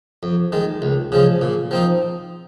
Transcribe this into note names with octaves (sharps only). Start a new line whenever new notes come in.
F2
D#3 G#3
C#2
C#3 F3 G#3
A#2
F3 C4 D#4